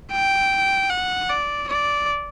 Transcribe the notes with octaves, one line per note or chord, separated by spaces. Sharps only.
G5
F#5
D5
D5